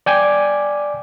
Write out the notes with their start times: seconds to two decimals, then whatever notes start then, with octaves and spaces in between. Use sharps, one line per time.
0.06 D5 G5 G#5 D6